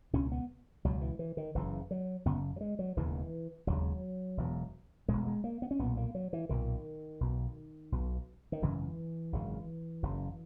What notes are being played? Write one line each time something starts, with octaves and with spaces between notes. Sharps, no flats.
C#2 B2 C#4
B3
C#2 B2 F#3
E3
E3
D#3
F#1 F#2 C#3 E3
F#3
F#1 F#2 C#3 B3
F#3
G#3
F#3
E1 D#2 C#3 E3
E1 D#2 C#3 F#3
E1 E2 B2
E1 E2 B2 G#3
G#3
A#3
B3
C#4
B1 A#2 B3
A#3
F#3
E3
B1 A#2 D#3
B1 B2
B1 B2
D#3
G#1 F#2 C#3 E3
G#1 F#2 C#3
F#1 F#2 C#3